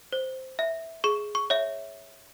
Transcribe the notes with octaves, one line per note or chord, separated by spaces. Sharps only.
C5
E5
G#4 C#6
C#6
C#5 E5